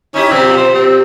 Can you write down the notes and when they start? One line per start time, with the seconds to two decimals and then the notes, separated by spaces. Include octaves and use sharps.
0.14 C#4 D#4 E4 G4
0.31 B2 F3 G3 C4
0.57 C5
0.75 C4